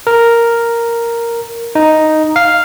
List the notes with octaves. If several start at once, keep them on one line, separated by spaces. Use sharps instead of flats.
A#4
D#4
F5